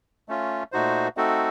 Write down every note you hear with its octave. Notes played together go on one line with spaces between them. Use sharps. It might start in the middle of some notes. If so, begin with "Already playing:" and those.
A3 C#4 F4
A#2 A3 D#4 F#4 C5
A3 C4 D#4 F#4 A4